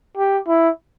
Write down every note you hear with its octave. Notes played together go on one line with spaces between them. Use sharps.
G4
E4